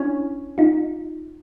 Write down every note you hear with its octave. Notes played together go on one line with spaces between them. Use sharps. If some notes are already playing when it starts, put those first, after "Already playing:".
Already playing: C#4 D4 E4
D#4 F4